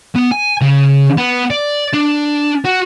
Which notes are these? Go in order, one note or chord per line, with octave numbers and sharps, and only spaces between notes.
B3
G#5
C#3
B3
D5
D4
F#4